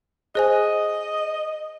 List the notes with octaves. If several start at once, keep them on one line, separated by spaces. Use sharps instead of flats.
G#4 C5 D#5 G#5